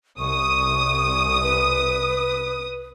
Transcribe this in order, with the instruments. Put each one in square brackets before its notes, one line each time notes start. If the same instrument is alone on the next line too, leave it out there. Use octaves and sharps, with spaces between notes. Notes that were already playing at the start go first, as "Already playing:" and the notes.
[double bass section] C2 [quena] C#6 [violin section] D#6
[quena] B4